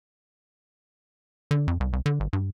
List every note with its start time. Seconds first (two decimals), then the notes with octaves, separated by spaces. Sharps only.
1.51 D3
1.68 F2
1.80 C2
1.93 C2
2.06 D3
2.20 G#1
2.33 G2